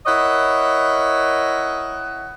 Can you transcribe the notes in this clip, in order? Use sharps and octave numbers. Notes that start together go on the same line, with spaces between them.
E4 A#4 C#5 D#5 F#5